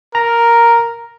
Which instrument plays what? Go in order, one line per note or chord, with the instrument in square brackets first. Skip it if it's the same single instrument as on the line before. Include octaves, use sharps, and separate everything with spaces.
[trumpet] A#4 [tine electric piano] A#5